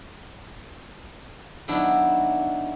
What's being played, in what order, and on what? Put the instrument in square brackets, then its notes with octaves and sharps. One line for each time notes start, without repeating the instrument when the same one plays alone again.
[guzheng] D#3 F#3 B3 D4 E4